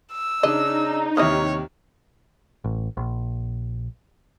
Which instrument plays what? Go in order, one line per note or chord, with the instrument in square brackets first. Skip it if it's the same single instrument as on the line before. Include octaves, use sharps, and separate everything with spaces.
[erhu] E6
[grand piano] C#3 D4 [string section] D#4 [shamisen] D#5
[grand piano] D#2 C3 F6 [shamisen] B3 E4 D#5 [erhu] C#5
[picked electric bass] A1
A#1